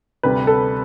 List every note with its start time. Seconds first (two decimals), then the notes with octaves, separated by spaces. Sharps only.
0.23 D2 C3 G3 B4
0.47 A4